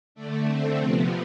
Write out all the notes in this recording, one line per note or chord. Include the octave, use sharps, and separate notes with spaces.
D3 A3 D4
C4
C3 F3 B3 C4